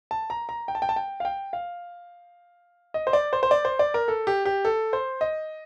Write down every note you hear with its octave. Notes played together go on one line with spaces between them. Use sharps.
A5
A#5
A#5
G5
A5
G5
A5
G5
F5
G5
F5
D#5
C5
D5
C5
C5
D5
C5
D5
A#4
A4
G4
G4
A4
C5
D#5